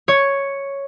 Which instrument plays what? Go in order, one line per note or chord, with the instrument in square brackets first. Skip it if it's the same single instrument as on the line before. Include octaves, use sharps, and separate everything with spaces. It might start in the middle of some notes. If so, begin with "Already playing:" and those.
[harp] C#5